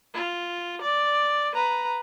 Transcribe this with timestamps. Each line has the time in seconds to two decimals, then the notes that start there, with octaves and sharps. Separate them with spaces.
0.14 F4
0.82 D5
1.54 B4 A#5